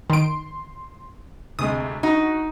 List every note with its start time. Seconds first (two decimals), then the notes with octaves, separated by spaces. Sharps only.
0.10 D#3 C6 D7
1.59 D2 C3 G#3 D#6
2.03 D#4 F#4